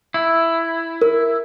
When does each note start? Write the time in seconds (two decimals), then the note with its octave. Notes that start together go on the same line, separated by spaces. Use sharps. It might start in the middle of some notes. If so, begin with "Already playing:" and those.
0.14 E4
1.01 A#4